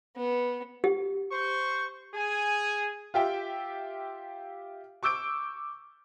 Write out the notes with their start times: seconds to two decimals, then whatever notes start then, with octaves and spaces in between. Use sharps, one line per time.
0.17 B3
0.84 G4
1.31 C5 C#6
2.13 G#4 G#5
3.14 F4 G4 E5 G5
5.03 C#6 D6 E6 G6 D7